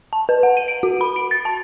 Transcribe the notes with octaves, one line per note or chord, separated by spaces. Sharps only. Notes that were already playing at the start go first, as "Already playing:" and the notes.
A5
B4
F#5
D#7
D7
F#4
B5
D7
A6
A5